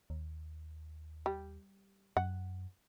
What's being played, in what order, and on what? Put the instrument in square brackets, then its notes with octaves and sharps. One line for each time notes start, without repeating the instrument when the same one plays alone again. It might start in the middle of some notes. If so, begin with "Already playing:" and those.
[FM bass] D#2
[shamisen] G3
[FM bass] F#2 [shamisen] F#5